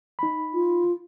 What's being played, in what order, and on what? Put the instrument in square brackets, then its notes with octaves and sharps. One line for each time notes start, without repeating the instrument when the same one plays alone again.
[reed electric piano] D#4 B5
[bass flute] F4